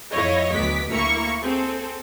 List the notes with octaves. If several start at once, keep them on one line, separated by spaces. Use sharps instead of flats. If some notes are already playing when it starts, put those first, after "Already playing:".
F2 E4 C#5 D#5 F5 A#6
D2 F#3 B3 D6 B6
D2 A#3 E4 A#5 C#6 C#7
C4 G#4 A4